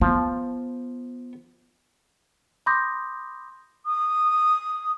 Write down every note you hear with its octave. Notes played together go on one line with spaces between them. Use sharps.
F3 B3
B5 C6 D6 D#6 G6 A#6
D#6